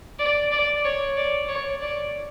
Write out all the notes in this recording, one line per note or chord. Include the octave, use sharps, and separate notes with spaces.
D5
D5
C#5
D5
C#5
D5